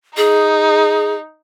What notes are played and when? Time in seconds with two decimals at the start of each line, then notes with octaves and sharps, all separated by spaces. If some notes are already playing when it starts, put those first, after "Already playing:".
0.17 D#4 G#4